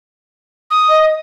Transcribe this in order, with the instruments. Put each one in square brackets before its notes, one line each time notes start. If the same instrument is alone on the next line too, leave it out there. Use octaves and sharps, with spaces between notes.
[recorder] D#6
[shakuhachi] D#5